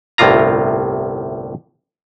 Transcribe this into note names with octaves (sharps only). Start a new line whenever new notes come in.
G1 C2 A2 C3 F4 A#5